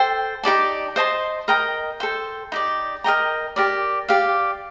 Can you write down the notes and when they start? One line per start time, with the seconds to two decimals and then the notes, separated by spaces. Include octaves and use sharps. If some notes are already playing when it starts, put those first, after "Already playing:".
Already playing: A4 C5 G5
0.43 D#4 G4 D5 A5
0.96 C5 D#5 A5 C6
1.48 A#4 D#5 G5 A#5
2.00 A4 C5 G5
2.52 D#4 G4 D5
3.04 A#4 D#5 G5 A#5
3.56 G4 A#4 D5
4.08 G4 D5 F5